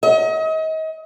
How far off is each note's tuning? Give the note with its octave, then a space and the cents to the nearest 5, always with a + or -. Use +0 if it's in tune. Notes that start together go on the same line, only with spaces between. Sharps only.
D#5 +35